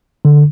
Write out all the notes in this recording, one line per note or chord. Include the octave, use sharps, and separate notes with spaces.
D3